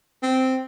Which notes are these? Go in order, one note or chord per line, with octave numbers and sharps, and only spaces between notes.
C4